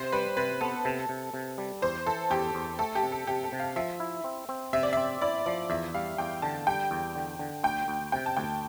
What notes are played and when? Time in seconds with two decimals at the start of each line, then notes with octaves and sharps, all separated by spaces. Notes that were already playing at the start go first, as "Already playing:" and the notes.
Already playing: C3 C5
0.12 G3 B4
0.37 C3 B4
0.61 B3 A4
0.85 C3 A4
1.09 C3
1.34 C3
1.58 G3
1.82 E2 C5
2.06 E3 A4
2.30 E2 G4
2.55 E2
2.79 A3 A4
2.95 G4
3.03 C3
3.12 A4
3.27 C3 G4
3.44 A4
3.52 C3
3.60 F5
3.76 F3 E5
4.00 E4
4.24 C4
4.49 C4
4.73 C3 E5
4.83 D5
4.93 C4 E5
5.21 E4 D5
5.46 F3 D5
5.70 E2 E5
5.94 G3 F5
6.18 E2 G5
6.42 D3 A5
6.67 G3 G5
6.91 E2
7.16 D3
7.39 D3
7.64 D2 G5
7.88 D2
8.12 C3 G5
8.26 A5
8.37 D2 G5